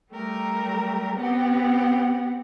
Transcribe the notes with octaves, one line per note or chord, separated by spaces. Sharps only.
G3 A3 G4 A#4
B3 C4 G4 F#5